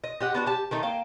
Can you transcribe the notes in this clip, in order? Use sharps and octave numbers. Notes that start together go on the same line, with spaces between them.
D#5
G4 D#5 F#5
B3 D4 F#4
G4 A5
D#3 A3 D#4
A#3 F5 G5